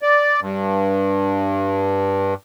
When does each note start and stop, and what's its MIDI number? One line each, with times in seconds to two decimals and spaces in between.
0.02 0.40 74
0.41 2.34 43